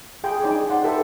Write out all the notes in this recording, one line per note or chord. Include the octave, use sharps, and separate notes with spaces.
G#4 G5 C6
D#4 G#4 D5 G5 G#5 D6
D5 F#5 C6
G4 A4 B4 E5 G5